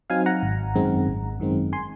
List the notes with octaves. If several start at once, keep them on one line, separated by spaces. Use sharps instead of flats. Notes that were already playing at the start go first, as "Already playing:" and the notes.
F#3 C4 D#4 F5 G#5
F#5 A#5
G#1
F#2 D#3 G#3 C4
G#1
F#2 D#3 G#3 C4
G#5 C6